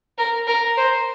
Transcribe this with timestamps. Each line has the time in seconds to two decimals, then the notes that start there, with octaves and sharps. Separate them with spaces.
0.18 A#4
0.47 A#4
0.77 C5